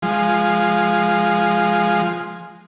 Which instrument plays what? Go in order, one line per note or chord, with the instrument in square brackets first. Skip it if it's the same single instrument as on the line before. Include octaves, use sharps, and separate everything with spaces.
[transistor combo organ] F3 G#3